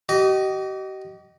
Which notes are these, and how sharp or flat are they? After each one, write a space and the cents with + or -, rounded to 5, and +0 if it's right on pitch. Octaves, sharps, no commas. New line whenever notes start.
G4 -40 D#5 -5